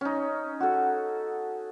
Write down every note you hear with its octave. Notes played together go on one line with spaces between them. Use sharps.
C#4 D#4
F#4 A4